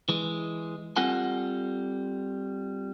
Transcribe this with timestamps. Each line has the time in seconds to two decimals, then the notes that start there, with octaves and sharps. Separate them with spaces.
0.09 E3 G#3
0.96 G3 C4 F4 A4 F#5 G#5